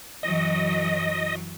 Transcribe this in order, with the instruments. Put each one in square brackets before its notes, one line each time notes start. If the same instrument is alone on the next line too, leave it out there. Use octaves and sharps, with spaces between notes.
[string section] F#2 E3 F#3 [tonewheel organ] D#5